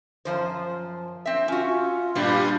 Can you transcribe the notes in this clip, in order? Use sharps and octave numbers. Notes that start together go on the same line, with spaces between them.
F#2 F3 C5
C4 E5
C#4 F4 F#4
G2 A#2 G3